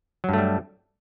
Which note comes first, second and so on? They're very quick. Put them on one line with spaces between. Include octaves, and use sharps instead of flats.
F#3 G2 A3 G3